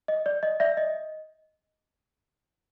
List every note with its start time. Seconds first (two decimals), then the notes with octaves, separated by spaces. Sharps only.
0.08 D#5
0.26 D5
0.43 D#5
0.60 D5 E5
0.77 D#5